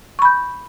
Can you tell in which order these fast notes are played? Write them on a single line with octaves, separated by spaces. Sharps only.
C#6 B5 G6